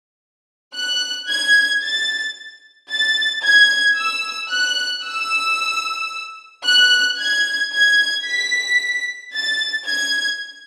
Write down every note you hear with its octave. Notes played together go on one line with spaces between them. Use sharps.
F#6
G#6
A6
A6
G#6
E6
F#6
E6
F#6
G#6
G#6
B6
A6
G#6